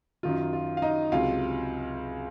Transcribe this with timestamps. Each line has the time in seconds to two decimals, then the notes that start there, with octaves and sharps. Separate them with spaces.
0.23 F#2 D#3 F#3 F4
0.53 F4
0.77 F5
0.82 D#4 D#5
1.12 C#2 C3 F#3 F4 F5